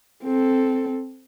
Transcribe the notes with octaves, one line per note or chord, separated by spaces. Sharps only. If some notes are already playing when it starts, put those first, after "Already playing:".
C4 A4